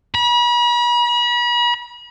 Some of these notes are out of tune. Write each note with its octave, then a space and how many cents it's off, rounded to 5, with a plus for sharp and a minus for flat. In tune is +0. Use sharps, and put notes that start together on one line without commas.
B5 -40